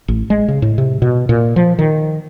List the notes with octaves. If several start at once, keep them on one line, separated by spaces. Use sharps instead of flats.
A1
G#3
C#3
A2
C3
B2
A#2
F3
D#3